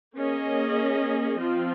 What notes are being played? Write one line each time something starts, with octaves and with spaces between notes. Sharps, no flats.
A#3 C#4 G#4 D#5
F3 C4 F4